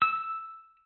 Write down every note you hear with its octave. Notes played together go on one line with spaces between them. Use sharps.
E6